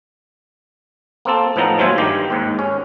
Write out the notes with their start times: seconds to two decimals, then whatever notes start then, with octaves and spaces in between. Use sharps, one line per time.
1.25 A#3 C4 A4
1.56 A2 F3 B3 D#4 A5 A#5
1.78 D#2 F#3 F4 C5 E5 G#5
1.98 G2 D#3 G4
2.30 D#2 G#2
2.59 C#4